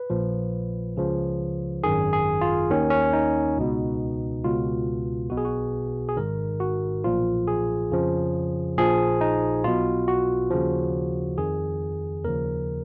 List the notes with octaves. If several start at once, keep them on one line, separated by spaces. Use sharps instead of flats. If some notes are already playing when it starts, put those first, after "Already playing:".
Already playing: B4
A#1 A#2 F3
C#2 C#3 F3
G#1 F#2 D#3 G#4
G#4
F4
D#2 D#3 C#4
C#4
D#4
C#2 B2
C#2 B2 F4
B1 B2 F#4
G#4
F#4
G#4
G#1 G#2 D#3 A#4
F#4
B1 A#2 F3 F4
G#4
F2 C#3 F3
A#1 A#2 F3 G#4
D#4
B1 B2 F4
F#4
D#2 C#3 F3
F2 D#3 G#4
D#2 C#3 F3 A#4